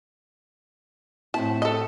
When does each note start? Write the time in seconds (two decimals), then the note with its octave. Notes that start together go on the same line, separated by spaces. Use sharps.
1.34 A2 C4 E4 A5
1.62 A4 D#5